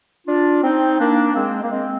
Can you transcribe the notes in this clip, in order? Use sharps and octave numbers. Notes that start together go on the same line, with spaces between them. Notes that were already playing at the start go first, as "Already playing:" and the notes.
D4 F4
C4 D#4
A#3 D4
G#3 C4
A#3
G#3 C4